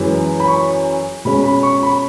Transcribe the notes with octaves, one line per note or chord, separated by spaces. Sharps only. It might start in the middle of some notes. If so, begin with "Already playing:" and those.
Already playing: F#2 E3 G#3
B5
C#6
B2 G#3 C#4 B5
B5
C#6
B5